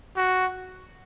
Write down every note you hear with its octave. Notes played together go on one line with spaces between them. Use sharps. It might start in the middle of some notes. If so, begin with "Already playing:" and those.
F#4